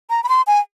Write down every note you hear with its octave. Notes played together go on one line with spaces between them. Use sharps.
A#5
B5
C6
G#5